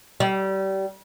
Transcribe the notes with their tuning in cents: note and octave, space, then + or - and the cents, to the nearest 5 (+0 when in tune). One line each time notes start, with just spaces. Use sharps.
G3 -30